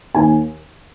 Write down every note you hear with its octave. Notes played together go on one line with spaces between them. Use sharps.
D#2 G#5